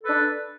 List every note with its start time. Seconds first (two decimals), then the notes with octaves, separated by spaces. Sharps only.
0.02 A4
0.05 B4
0.08 D4